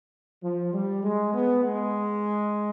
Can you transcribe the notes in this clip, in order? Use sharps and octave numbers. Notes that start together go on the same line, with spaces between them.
F3
G3
G#3
B3
G#3